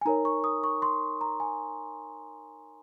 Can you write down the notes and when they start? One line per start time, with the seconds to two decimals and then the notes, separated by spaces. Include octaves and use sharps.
0.01 G#5
0.05 D#4 A#4 C#5 A#5
0.25 C#6
0.44 D#6
0.64 C#6
0.82 C6
1.21 A#5
1.40 G#5